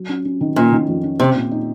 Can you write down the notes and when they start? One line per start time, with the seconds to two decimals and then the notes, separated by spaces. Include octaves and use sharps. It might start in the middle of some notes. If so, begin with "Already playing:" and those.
Already playing: F#3
0.09 C#4
0.25 C#4
0.41 D#3
0.56 A#2 C#4
0.72 D#3
0.88 F2
1.03 C#4
1.19 C3 C4
1.35 A#2
1.51 D#4